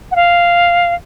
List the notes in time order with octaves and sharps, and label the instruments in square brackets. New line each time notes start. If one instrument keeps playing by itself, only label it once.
[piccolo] F#5
F5